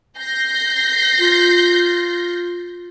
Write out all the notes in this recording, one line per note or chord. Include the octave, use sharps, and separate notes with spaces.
G6 A#6 C7
F4